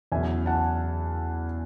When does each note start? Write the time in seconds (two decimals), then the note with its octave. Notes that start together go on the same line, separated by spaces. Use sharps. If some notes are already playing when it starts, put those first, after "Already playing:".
0.12 E2 C#3 F#3 E5 G#5
0.46 F#5 A5